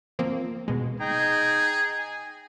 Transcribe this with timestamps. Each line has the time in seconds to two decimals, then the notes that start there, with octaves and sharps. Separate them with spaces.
0.19 F3 A#3 C4
0.68 B2 G#3
1.00 D#4 G#4 G5 A#5
1.98 G#5